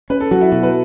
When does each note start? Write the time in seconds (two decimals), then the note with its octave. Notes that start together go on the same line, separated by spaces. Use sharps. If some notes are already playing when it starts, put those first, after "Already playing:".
0.10 C#4 B4
0.20 A4
0.31 F#3 F#4
0.41 E4
0.52 B2 F#4
0.63 B4